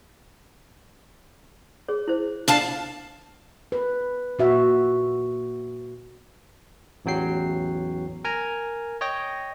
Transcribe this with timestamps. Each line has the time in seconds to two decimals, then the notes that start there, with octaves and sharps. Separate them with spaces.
1.88 G#4 C#5
2.08 E4 C5
2.48 D4 F5 A5
3.72 B4
4.39 A#2 F#4 E5
7.05 A1 E2 F#3 G5 C7
8.25 A#4 G#5 A#5
9.01 C#5 D#5 G5 A#6